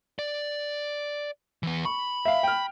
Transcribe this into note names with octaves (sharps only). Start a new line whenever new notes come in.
D5
E3 B3
B5 C#6
E5 F5
G5 F6